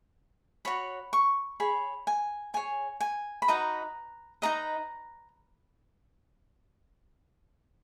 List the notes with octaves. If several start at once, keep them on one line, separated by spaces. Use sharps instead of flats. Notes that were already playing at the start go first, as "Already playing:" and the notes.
F#4 C#5 B5
C#6
G#4 C#5 B5
G#5
G#4 C#5 G#5
G#5
B5
D#4 F#4 B4 D#5 A#5
D#4 F#4 B4 D#5 A#5